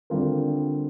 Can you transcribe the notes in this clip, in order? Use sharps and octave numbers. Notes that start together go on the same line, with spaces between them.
D3 G3 C4 F4 A#4